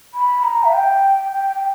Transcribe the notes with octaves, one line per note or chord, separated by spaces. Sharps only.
B5
A#5
E5
G5
G5
G5